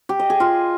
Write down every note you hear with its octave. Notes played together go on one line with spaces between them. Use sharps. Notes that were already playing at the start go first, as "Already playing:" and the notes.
G4
D#5
G#4
F4